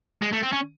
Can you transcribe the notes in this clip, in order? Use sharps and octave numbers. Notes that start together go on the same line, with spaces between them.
G#3
A3
C4
C#4